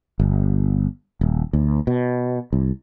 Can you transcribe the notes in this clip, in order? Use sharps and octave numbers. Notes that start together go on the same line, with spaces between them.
G1
D#1
D2
B2
C2